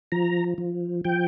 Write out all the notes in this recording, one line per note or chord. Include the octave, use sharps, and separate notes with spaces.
F3 A#5
F3
F3 G5